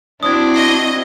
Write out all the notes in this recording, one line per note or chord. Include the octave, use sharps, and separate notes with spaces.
C4 D4 E4 F#4 D#6 G#6
D#5 C7